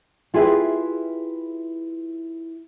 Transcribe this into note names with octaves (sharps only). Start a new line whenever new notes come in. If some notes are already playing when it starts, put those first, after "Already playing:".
E4 F4 G4 G#4 B4 E5